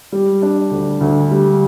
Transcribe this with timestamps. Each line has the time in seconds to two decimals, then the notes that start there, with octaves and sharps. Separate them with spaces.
0.12 G3
0.42 D4
0.71 D2
1.01 D2
1.31 G3